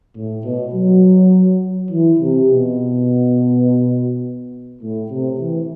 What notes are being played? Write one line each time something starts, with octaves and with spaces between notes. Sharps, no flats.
A2
B2
F#3
E3
C3
B2
A2
C3
E3